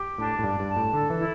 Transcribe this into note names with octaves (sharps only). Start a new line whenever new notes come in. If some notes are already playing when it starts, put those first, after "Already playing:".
Already playing: G4
A2 D4
A2
G2 D5
G2
A5
A2
D3 A4
E3
E4